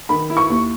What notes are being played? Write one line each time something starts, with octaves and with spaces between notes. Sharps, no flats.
D#3 B5
E4
C#6
D#2